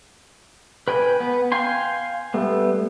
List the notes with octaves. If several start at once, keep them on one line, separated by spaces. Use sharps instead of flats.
B4 G5 G#5 B5
B3
F5 G5 G#5 C6
G3 A3 B3